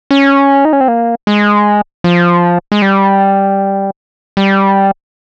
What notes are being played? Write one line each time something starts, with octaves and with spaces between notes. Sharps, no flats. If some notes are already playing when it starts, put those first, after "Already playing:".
C#4
D#4
C#4
C4
A#3
G#3
F3
G#3
G3
G3